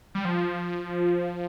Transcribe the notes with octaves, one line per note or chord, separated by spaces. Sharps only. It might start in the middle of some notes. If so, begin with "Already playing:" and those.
G3
F3